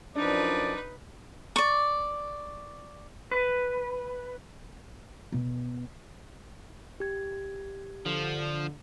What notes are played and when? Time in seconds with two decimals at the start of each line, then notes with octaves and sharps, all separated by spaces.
0.15 F#2 F3 D4 D#4 B4 D5
1.56 D5 C#6
3.31 B4
5.32 B2
7.00 G4 G#6
8.05 D3 F3